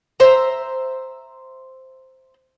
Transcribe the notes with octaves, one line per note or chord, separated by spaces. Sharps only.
C5 E5 A#5